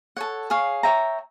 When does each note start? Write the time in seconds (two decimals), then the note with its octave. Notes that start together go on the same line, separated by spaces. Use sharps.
0.17 A4 C#5 F#5
0.50 G#4 C#5 F5
0.83 C#5 E5 G5 A#5